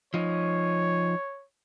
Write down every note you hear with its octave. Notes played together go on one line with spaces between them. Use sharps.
F3 D#4 C#5